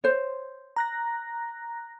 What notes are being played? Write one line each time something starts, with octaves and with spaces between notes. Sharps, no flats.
C5 C#5
A#5 F#6 A#6